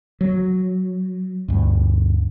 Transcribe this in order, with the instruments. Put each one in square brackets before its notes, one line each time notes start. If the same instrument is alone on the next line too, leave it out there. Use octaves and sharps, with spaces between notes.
[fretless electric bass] F#3
D2 G2